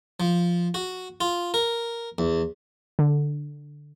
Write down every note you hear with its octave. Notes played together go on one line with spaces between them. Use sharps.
F3
F#4
F4
A#4
E2
D3